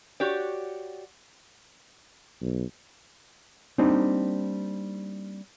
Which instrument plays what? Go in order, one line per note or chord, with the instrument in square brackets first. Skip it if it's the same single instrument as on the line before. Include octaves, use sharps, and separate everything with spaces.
[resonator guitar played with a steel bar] F#4 G4 C#5 D5
[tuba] B1
[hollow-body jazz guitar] G3 A#3 C4 D4 D#4